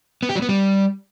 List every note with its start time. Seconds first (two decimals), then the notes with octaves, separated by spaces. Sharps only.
0.23 B3
0.29 G4
0.36 F#3
0.42 B3
0.49 G3